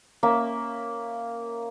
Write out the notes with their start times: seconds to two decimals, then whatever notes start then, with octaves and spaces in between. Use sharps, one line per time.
0.23 A#3 C#4 E5